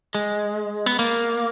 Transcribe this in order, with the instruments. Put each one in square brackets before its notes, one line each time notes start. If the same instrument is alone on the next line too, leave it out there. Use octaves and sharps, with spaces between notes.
[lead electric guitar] G#3
B3
A#3